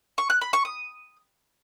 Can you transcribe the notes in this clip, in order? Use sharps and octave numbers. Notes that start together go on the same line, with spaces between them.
C#6
F#6
B5
C#6
D#6